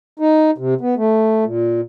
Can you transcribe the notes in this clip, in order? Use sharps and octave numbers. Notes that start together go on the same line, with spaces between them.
D#4
C3
B3
A3
A#2